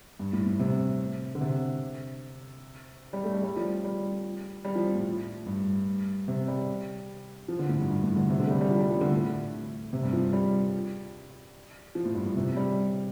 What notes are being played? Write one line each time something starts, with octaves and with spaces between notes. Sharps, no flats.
G2
A2
A2
C3
D3
C3
G3
A3
G3
G3
F3
G3
G3
F3
A2
G2
C3
G3
F3
D3
A2
G2
G2
A2
D3
C3
D3
A3
G3
G3
F3
G3
F3
D3
A2
C3
G2
F3
G3
F3
A2
G2
A2
C3
G3